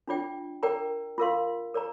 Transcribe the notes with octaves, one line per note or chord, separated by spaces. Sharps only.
D4 F4 D5 G5
A#4 D5 G5 A#5
F4 A#4 F5 C6
A#4 D5 A#5